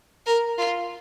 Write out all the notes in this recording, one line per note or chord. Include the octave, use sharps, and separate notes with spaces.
A#4
F4